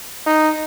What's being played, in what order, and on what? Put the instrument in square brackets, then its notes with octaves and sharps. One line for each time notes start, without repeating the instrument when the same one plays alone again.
[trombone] D#4